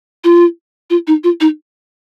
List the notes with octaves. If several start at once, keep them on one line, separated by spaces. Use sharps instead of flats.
F4
F4
D#4
F4
D#4